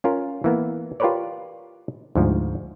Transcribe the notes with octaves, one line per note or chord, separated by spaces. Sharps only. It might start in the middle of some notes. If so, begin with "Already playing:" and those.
C#4 F4 A#4
E3 A#3 B3
F4 G4 A#4 B4 C#5 D5
D2 G#2 F3